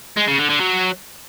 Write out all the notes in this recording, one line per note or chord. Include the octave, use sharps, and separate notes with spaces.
G#3
C#3
D3
D3
F#3